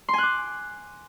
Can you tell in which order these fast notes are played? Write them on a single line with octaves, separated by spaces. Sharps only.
C6 G#5 F#6 D6